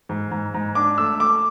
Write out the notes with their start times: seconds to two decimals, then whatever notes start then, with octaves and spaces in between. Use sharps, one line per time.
0.09 G#2
0.31 G#2
0.54 G#2
0.75 D4 D6
0.98 A3 E6
1.20 A3 D6